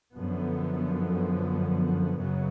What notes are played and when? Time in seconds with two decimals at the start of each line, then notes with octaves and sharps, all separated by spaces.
0.15 F#2 D3 F3 B3
2.18 F#2 C#3 F#3 B3